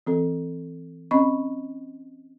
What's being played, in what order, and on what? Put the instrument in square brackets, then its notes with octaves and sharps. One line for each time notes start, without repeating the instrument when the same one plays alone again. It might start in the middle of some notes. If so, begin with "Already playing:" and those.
[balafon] E3 C4 A4
C4 C#4 D#5 B5 C#6